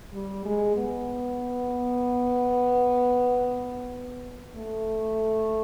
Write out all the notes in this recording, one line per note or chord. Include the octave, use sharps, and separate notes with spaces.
G3
G#3
B3
A3